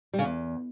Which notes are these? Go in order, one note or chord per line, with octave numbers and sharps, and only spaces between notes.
G3
C#3
E2